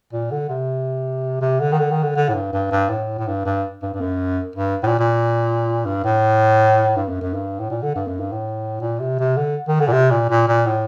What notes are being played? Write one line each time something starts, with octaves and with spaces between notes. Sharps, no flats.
A#2
D3
C3
C3
D3
D#3
D3
D#3
D3
D3
A2
G2
G2
G2
A2
A2
G2
G2
G2
G2
F#2
G2
A2
A#2
A#2
G2
A2
G2
F#2
F#2
G2
A2
A#2
D3
G2
F#2
G2
A2
A#2
C3
C3
D3
D#3
D3
A#2
C3
A#2
A#2
A#2
A2